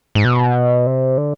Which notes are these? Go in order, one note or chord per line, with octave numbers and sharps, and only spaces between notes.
G#2
B2
C3
D3